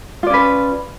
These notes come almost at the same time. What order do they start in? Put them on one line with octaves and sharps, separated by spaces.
F4 D5 C#4 B4